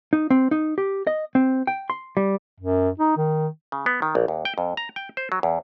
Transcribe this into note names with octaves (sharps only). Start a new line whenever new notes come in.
D#4
C4
D#4
G4
D#5
C4
G5
C6
G3
F#2
D#4
D#3
C#3
B3
D#3
A#1
D#2
G5
F2
A#5
G5
C5
F#3
E2